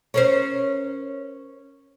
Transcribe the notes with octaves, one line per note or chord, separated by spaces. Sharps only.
C#4 A#4 C5